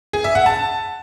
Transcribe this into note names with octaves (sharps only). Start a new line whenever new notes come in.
G#4
E5
F#5
A5